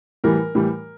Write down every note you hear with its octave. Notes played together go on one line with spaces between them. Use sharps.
A2 E3 G3 A#4
A2 E3 G3